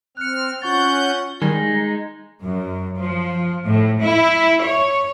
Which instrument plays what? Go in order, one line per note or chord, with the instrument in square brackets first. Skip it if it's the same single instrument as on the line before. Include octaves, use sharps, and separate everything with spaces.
[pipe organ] C4 F6 [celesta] F#6 C#7
[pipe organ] C#4 F#5 G6 [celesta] F4 C#6 A6
[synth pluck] D#3 G3 [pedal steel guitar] G#3 D#4
[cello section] F#2
F3
A2
E4
C#5